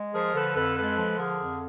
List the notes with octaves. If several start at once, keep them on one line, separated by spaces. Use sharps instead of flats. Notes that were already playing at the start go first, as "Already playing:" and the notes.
Already playing: G#3
F3 G#4 A#4
D3 A4 B4
F2 A4 B4
G#3 A4 B4
F3
D3 G#4 A#4
F2